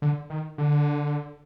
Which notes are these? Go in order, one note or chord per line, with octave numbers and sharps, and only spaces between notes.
D3
D#3
D3